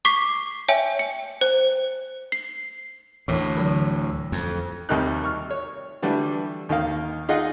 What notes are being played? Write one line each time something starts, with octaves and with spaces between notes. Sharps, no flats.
C#6 D6 B6 C7
C#5 E5 G5 G#5
C#7
C5
C7
D2 A2 E3
D3 F#3
F2
D#2 C3 G3 A#3 D#4 F#6
C#6 F6
C#5
D3 E3 G3 A3 D4
D#2 D#3 A#3 F5
D#4 F4 G#4 D#5 F#5